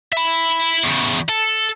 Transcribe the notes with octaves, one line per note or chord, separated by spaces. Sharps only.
E5 B5
E2 C#3
A4